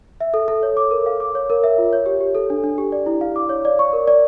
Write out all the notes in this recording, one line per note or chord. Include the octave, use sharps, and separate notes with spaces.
E5
A4
A4
C#5
D6
A#4
F5
D6
C#5
A#4
E5
F4
C#5
G4
G4
A4
D4
D4
G4
D5
E4
F5
D6
C#5
D5
C#6
A#4
D5